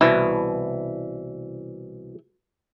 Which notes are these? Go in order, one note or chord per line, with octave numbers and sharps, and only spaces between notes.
C2 B2 E3